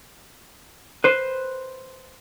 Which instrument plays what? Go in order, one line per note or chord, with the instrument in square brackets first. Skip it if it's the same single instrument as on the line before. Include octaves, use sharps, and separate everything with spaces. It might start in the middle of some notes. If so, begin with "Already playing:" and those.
[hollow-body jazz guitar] B4 C5